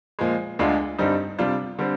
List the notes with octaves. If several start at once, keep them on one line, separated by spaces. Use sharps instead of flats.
A#2 F3 G#3
D2 D3 G#3 D4 F4
G2 D3 G3 C4 D#4
C3 G3 D4 F4
D3 G3 C4